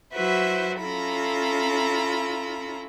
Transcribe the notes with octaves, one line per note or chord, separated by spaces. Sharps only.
F#3 E4 F#4 B4 C5 E5
C#4 E4 F4 A4 A#5 B5